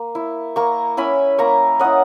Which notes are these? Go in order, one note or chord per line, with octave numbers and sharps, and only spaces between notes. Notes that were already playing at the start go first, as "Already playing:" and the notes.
Already playing: A#3
E4
A#3 A#5 C#6
C#4 E4 G#5 B5
A#3 A#5 C#6
C#4 E4 D#5 F#5